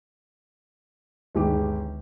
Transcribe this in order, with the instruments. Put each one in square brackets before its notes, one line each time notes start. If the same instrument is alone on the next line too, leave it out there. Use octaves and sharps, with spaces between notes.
[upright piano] G1 G#3 G4 [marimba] D2 D#3 D#4